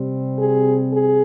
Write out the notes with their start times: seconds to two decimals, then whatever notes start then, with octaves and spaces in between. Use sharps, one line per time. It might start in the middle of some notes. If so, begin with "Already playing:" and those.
Already playing: C3 G3 C4
0.38 G#4
0.93 G#4